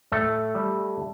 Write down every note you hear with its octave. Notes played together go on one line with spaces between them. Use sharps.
A2 A3 A4
G3